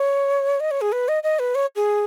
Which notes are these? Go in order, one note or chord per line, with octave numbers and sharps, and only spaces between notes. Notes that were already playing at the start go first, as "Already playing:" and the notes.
Already playing: C#5
D#5
C#5
G#4
B4
D#5
D#5
B4
C#5
G#4